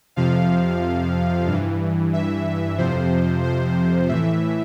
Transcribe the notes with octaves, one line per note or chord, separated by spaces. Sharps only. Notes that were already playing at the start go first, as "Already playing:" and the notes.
F2 C3 F3 F5
G2 E3
E5
F2 C3 F3 C5
C5
A2 E3 E5